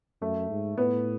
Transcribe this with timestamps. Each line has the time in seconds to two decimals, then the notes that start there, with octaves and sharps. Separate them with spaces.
0.21 F#2 A3
0.50 G#2
0.78 A2 B3